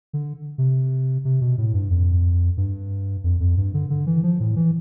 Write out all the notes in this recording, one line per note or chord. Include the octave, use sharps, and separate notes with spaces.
D3
C3
C3
B2
A2
G2
F2
G2
F2
F2
G2
D3
D3
E3
F3
A2
E3